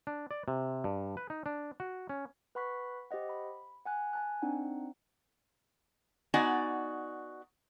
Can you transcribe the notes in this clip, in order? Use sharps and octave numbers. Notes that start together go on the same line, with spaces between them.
D4
D5
C3
G2
B4
D#4
D4
F#4
C#4
B4 F#5 B5 C#6 F#6 B6
G4 C5 D#5 F#5
B5
F#5 G#5 F#6
G#5 A5 F#6
C4 D4 D#4 F#5
B3 D#4 F#4 D5 G#5